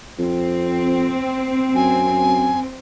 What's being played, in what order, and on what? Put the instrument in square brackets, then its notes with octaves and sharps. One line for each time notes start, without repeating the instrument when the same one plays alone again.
[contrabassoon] F2 [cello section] C4
[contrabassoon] F#2 [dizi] G#5